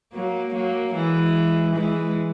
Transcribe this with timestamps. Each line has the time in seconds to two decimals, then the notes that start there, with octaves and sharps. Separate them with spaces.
0.13 F#3 A#3
0.54 F#3 A#3
0.94 E3 G#3
1.75 E3 G#3